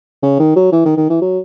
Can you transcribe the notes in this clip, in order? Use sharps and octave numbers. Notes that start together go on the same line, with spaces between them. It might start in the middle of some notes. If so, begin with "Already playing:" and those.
C#3
D#3
F#3
E3
D#3
D#3
E3
F#3